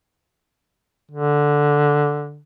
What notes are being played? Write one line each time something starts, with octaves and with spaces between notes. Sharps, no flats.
D3